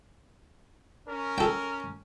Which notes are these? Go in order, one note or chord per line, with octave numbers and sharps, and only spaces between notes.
C#4 A#4
A4 G5